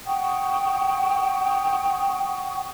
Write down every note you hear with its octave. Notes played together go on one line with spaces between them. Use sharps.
F#5 G5 C#6 D#6